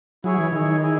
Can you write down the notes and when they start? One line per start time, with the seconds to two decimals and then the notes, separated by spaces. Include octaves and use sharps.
0.24 F#3 E4 G#4 C#5
0.38 E3
0.53 D#3 E4 G#4 C#5
0.82 E4 G#4